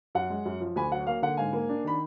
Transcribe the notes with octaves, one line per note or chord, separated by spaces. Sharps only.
F#2 F#5
G#3
F#2
F3
D2 G#5 B5
F#3 F#5
A#3 F5
D3 F#5
G#2 F5 G#5
A#3
D4
D#3 B5